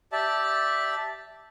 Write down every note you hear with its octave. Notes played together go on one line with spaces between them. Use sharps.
G4 D5 E5 A5